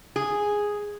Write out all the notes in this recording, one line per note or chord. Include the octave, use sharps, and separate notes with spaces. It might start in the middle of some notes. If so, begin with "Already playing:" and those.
G#4